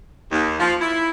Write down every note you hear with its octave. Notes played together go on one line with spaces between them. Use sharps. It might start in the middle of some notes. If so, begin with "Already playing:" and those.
D#2
F3
E4